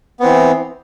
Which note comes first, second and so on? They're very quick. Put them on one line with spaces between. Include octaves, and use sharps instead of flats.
B3 C4 E3